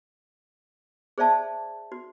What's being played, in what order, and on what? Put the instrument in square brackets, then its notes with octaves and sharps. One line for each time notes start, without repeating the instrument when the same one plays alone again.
[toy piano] G#4 C5 D5 E5 A5
F#4